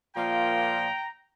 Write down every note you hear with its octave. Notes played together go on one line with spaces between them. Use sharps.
A#2 F3 A#3 F4 G5 A#5